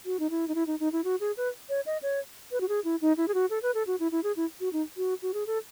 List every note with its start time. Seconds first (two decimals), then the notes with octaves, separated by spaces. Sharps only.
0.05 F#4
0.20 D#4
0.30 E4
0.48 D#4
0.55 E4
0.67 D#4
0.80 D#4
0.93 E4
1.04 F#4
1.20 G#4
1.37 B4
1.69 C#5
1.86 D#5
2.03 C#5
2.52 B4
2.61 F#4
2.69 G#4
2.84 E4
3.01 D#4
3.17 E4
3.28 G#4
3.34 F#4
3.50 A4
3.63 B4
3.75 A4
3.87 F#4
4.00 E4
4.12 E4
4.24 G#4
4.36 E4
4.60 F#4
4.73 D#4
4.97 F#4
5.22 F#4
5.34 G#4
5.47 A4